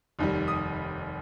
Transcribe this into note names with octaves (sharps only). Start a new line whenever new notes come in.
F1 D#2 D#3 G3
D#6